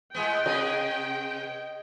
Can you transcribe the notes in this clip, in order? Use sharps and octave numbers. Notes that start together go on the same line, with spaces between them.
A2 G#3 B3 G5
C3 G#4 B4 D#5